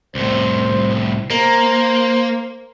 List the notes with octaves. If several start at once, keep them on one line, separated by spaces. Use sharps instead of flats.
C2 A2 C5
A#3 A#4 C5